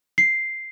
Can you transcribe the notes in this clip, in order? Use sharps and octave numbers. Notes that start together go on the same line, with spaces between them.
C7